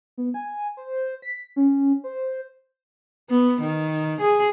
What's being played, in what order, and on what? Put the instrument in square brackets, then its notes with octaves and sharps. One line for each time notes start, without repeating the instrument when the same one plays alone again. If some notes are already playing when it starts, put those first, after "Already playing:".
[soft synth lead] B3
G#5
C5
B6
C#4
C5
[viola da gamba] B3
D#3
G#4